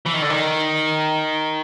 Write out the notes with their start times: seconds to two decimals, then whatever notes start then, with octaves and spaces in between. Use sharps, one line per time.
0.06 E3
0.14 D#3
0.22 D3
0.30 D#3